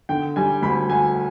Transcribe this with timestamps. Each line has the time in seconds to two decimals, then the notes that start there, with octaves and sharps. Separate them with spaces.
0.09 D3 G5
0.36 G3 G#5
0.62 D2 B5
0.90 D2 G#5